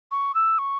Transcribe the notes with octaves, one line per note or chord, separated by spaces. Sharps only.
C#6
E6
C#6